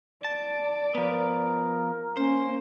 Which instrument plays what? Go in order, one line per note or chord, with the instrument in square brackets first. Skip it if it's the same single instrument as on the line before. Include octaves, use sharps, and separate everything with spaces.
[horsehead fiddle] D5 [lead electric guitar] A5
[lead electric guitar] F3 B3 [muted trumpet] A#4
[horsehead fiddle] A#3 [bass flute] C#4 [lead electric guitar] C5